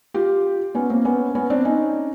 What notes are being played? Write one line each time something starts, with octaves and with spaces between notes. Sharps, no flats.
F4 G4
B3 C#4
A#3 C4
B3 C#4
B3 C#4
C4 D4
C#4 D#4